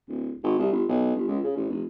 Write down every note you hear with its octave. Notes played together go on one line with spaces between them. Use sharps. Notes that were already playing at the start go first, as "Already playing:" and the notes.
D1
G#1
C2
G1
B1
G1
C#2
C#3
A1
F1